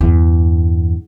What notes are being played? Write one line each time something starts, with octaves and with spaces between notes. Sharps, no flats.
E2 G2